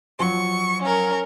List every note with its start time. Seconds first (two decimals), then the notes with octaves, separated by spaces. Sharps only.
0.19 F3 F#3 C#6
0.82 C#4 A#4